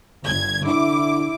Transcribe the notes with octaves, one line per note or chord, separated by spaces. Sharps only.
G1 G#6
D3 E4 D6